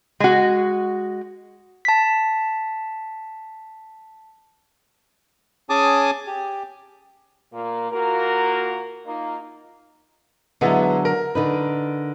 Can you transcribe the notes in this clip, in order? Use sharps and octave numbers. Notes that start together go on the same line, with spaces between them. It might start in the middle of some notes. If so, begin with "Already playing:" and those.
G#3 F#4
A5 B6
C#4 G#4 G#5 A5 D6 D#6
G4
A#2 A#3
A#2 A#3 F#4 A#4
A#3 D#4 F4
D3 F#3 G#3 B3 E4
A#4
D3 D#4 B4